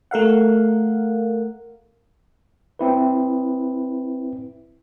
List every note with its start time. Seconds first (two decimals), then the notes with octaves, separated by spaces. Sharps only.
0.11 A3 A#4 F5 F#5
2.79 C4 E4 B4